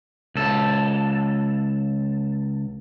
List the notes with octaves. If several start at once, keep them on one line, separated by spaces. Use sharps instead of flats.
C#2 A4